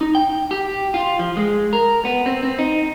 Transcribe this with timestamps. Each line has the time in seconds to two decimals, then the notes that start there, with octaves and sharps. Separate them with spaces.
0.01 D#4
0.15 G5
0.51 G4
0.94 F4
1.19 F3
1.37 G#3
1.73 A#4
2.05 B3
2.26 C4
2.43 C4
2.59 D#4